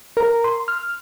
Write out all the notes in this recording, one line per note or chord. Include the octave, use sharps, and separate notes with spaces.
A#4
C6
F6